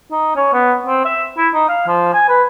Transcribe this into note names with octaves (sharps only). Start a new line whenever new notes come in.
D#4
C#4
B3
C4
E5
E4
D#4
F5
F3
G#5
B4